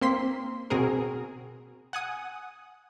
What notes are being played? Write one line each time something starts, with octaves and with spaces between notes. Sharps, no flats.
A#3 C4 C6 B6
B2 C4 G#4 A#4
F#5 G#5 D#6